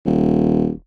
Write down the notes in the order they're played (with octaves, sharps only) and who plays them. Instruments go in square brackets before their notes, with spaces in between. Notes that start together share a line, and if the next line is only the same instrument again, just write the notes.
[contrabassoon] D#1